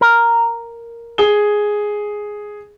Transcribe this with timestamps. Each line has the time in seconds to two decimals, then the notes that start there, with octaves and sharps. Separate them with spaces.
0.01 A#4
1.18 G#4 G7